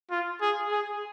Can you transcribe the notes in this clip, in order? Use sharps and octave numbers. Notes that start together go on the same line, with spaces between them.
F4
G#4
G#4